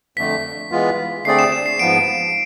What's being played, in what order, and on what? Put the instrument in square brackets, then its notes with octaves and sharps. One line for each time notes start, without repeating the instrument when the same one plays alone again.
[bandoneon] F2 D3 A3 [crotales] B6
[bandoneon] E3 G#3 B3 F4
[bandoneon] D3 A3 C4 G#4 D5 [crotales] C7
[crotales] E7
E7
C7
[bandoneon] G#2 F3 B3 [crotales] D7